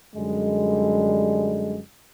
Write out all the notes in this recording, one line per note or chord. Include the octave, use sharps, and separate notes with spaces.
F#2 D3 G3 G#3